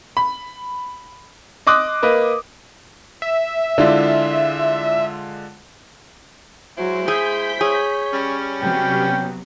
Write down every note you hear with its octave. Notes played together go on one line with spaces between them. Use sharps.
B5
D#5 C6 D6 D#6 F#6
A#3 B4 D#5
E5
D3 G#3 E4 F4 D5
F#3 G#3 E4 C5
G#4 G6 B6
G#4 C#5
G3 C#4
C3 F#3 B3 G5